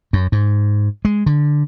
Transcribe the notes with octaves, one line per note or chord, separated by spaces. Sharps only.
F#2
G#2
G#3
D3